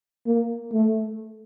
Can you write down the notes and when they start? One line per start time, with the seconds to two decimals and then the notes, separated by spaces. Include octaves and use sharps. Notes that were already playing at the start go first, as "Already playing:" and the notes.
0.26 A#3
0.72 A3